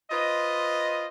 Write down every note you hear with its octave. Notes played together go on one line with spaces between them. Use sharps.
F4 B4 C5 D#5